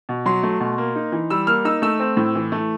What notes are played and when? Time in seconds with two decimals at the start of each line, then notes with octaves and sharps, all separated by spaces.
0.09 B2
0.26 F#3 C6
0.43 A3
0.60 B2
0.78 A#3
0.96 D#4
1.12 E3
1.30 G3 E6
1.47 A#3 F6
1.65 D#4 E6
1.82 A3 E6
2.00 C4
2.17 A2
2.35 E3
2.52 A3